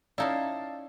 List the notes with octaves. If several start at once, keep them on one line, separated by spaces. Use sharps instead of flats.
C#4 D#4 E4 D5 F5 A5